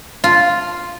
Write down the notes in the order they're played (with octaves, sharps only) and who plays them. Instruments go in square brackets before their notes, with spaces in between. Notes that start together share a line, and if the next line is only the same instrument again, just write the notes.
[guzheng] F4